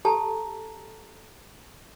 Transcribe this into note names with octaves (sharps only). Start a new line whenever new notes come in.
G4 A4 A5 A#5